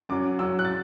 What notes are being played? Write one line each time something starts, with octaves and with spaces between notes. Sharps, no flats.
F#2 F#3 D6
F#2 F#3 E6
F#6
A6